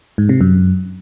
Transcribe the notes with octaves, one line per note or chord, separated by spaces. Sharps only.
G#2
C3
F#2